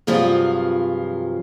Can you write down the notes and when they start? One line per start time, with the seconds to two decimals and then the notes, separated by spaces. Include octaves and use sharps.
0.07 G2 C3 F3 F#3 F4 G#4